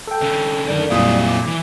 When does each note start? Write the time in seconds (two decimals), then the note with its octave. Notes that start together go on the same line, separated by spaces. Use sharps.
0.07 A4 G5
0.21 D3 C#4
0.68 F#2 D3 D#3 A3 D5
0.90 G1 F2 A#2 F#3 G3 A#3 E4 D#6
1.29 D6
1.47 E3